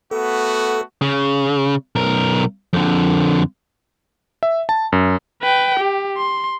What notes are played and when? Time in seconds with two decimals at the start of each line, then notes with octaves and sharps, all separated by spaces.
0.11 A3 B3 F#4 A4
1.01 C#3
1.96 B1 A#4
2.73 F2 D3
4.43 E5
4.69 A5
4.92 F#2
5.42 B4 G5
5.79 G4
6.17 C6